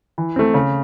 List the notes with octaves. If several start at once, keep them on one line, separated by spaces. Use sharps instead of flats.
E3
A3 C4
C#3